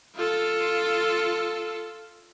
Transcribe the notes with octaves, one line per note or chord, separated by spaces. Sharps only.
F4 A4